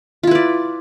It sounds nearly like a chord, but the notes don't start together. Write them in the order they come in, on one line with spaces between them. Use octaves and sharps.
F4 E4 B4 D5